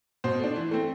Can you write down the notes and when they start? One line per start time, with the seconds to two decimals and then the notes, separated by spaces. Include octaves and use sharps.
0.24 B2 C5
0.39 A3 D4
0.56 E3
0.71 A3 C4